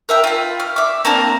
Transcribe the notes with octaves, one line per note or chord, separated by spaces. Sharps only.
A#4 E5 G5
F4 B5
F6
E5 D6
A#3 C4 D4 A#4